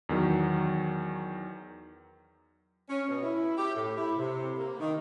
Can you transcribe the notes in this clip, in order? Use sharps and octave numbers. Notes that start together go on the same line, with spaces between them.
E2 D#3 F#3
C#4
B2
E4
G4
A2
E4
C3
A#3
D#3